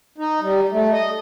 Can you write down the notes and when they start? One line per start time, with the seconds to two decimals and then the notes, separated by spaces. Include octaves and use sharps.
0.18 D#4
0.41 G3
0.71 A3
0.92 D#5